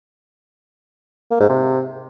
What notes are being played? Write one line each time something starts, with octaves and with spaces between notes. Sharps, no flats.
A#3
G#2
C3